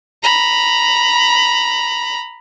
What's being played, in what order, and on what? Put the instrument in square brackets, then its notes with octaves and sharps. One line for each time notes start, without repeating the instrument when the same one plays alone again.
[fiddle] A#5 B5